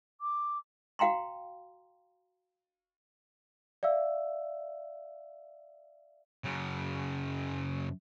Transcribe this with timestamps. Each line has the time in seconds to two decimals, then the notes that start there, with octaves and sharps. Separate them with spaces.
0.21 D6
0.99 F#4 F5 G5 A#5 C6
3.83 D5 E5 F5 E6
6.44 F#2 C#3